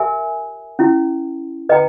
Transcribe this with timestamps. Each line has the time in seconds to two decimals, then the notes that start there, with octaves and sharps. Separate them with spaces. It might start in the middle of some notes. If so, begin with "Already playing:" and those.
Already playing: G4 A#4 E5 G#5
0.79 C#4 E4 G4
1.69 B4 D#5 G5 A#5